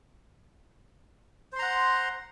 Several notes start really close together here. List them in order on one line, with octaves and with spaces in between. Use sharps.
C5 C6 A#5 F#5